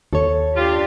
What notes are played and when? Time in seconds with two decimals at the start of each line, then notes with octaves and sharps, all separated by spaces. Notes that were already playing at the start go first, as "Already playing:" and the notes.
0.13 D#2 A4 C#5
0.55 D4 F4 G4